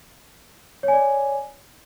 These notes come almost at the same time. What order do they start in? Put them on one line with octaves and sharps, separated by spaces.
C#5 G#5 D5